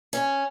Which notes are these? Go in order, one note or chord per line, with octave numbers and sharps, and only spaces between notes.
C#4